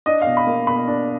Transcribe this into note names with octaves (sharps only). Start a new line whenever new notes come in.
D4 D#5
B2 F5
B5
A#3
B2 B5
D4